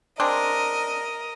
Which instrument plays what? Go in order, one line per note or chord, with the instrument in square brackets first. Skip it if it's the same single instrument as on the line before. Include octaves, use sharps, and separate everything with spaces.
[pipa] G#3 C4 D4 [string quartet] A#4 D#5